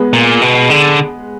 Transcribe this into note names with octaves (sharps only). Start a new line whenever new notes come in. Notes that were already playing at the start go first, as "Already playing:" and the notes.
Already playing: G#3 B3
A#2
B2
D3